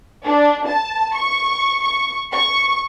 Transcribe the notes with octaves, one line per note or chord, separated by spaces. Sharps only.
D4
A5
C#6
C#6
C#6